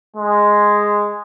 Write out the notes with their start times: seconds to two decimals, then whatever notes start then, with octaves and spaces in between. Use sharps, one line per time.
0.17 G#3